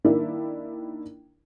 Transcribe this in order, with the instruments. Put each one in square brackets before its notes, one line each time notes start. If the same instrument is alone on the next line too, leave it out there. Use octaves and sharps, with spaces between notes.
[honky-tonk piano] D#3 A#3 D4 E4